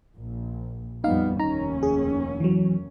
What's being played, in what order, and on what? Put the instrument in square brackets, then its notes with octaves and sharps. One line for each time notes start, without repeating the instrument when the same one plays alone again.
[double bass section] A#1
[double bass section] F2 G3 B3 [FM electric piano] D#4 F5
[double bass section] F1 D#2 C#4 [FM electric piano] D#4 A#5
[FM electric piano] G#4
E3 F#3